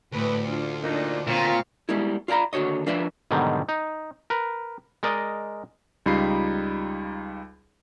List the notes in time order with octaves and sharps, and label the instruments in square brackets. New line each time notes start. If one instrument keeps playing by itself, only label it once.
[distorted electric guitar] D2 [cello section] A2 B4
[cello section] D4 F4
[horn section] A#2 D#4 [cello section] D4
[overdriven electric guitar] A#2 [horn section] C4 C#5 F5
[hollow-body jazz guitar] G3 G#3 B3 E4
F4 D5 F5 A#5 B5
D#2 D3 F#4 C#5 D#5
F3 D4 F4 B4 D5 E5
[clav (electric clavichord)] G#2 B2 D3 D#3 F#3 G3
D#4
A#4 B4
G#3 A#4 D5 D#5
[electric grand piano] C#2 G3 D#4 F4 B5 C7